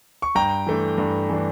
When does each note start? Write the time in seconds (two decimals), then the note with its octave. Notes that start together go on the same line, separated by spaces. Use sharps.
0.22 C#6
0.35 G2 G5 A#5
0.67 E3 A3 D4
0.98 G2
1.29 E3 A3 D4